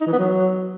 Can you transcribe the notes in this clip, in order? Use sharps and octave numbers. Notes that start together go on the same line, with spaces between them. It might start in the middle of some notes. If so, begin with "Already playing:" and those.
D#4
E3
B3
F#3